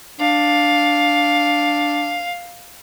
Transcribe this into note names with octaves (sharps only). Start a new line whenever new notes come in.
D4 F5